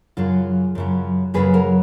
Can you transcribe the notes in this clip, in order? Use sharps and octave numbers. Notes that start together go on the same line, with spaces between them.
F#2 C#3 F#3 F4 G#4
F#2 C#3 F#3
F#2 C#3 F#3 G#4 B4
F#4 A#4